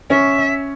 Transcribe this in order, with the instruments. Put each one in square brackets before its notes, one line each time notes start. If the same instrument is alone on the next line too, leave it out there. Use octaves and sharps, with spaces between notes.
[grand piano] C#4 [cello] E5